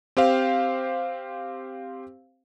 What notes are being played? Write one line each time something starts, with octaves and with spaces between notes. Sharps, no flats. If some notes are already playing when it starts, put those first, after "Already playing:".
C4 G4 C5 F5